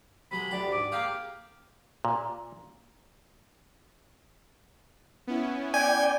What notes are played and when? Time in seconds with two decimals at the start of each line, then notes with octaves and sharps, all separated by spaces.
0.31 C3 F#3 G#3 B5
0.51 D2 G4 D5
0.71 G#2 D6
0.92 A#3 G4 G#4 F5
2.05 A#2
5.27 B3 C#4 E4
5.74 D5 G5 G#5